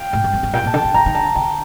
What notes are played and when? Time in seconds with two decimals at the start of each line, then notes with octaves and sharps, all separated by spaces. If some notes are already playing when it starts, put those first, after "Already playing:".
Already playing: F5 G5
0.13 A2
0.24 G2
0.33 F2
0.43 G2
0.53 A#2 G5
0.64 A#2 A5
0.74 D3
0.81 D#3 A5
0.94 D#3 A#5
1.06 D#3
1.14 D3 A5
1.35 D3 G5